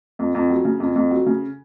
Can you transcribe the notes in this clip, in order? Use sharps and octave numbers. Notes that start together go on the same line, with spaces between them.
F2
F2
F#3
C#3
F2
F2
F#3
C#3